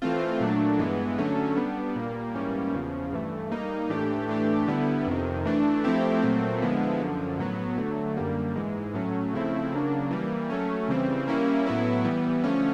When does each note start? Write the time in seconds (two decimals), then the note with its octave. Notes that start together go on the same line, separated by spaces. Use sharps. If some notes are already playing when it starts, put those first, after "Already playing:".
0.02 E3 A3 C4 F4
0.40 A#2 F#3 A3 D4
0.79 G2 E3 G#3 B3
1.18 D3 F#3 A3 C#4
1.57 G3 B3 D4
1.96 A#2 G3 A#3
2.34 G#2 E3 G3 A#3 C#4
2.74 E2 C#3 F3
3.13 G2 E3 A3
3.51 G3 A#3 D#4
3.90 A2 E3 A3 D4 G4
4.29 A2 E3 A3 D4 G4
4.67 D3 G3 B3 E4
5.07 F2 C3 D#3
5.45 E3 A3 D4
5.84 F3 A3 C4 E4 G4
6.22 A#2 F#3 A3 C4
6.62 D3 F3 G#3 B3 E4
7.00 F#2 D3 F3
7.39 A2 F#3 B3
7.78 D3 F#3 A3
8.17 F#2 D3 G3 A#3
8.55 G#2 E3 G#3
8.94 A2 F#3 A3 C#4
9.33 C#3 F3 A3 C4 E4
9.72 C#3 F#3 A#3 D4
10.11 E3 G3 A#3
10.50 F#3 A3 C#4
10.89 C#3 E3 G3 C4
11.27 G3 A#3 C#4 E4
11.67 A2 F#3 B3 E4
12.05 E3 G3 B3
12.44 D3 F3 A3 C#4